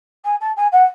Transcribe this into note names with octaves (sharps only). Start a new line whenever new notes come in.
G#5
A5
G#5
F#5